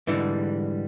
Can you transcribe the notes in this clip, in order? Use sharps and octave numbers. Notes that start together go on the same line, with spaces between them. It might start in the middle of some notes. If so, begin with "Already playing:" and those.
G#2 D3 E3 G3